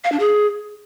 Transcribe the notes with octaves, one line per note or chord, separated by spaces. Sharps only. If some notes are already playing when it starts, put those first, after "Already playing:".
F5
D4
G#4